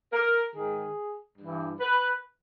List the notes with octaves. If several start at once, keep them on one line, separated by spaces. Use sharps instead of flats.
A#4
G#2 D#3 G#4
G2 E3
B4